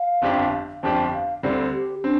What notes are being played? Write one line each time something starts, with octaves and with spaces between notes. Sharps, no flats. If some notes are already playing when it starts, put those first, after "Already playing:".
Already playing: F5
G1 F2 F3 D4 G4
G1 F2 F3 D4 G4 G5
F5
D2 D3 G3 C4 D5
G4
C4 D4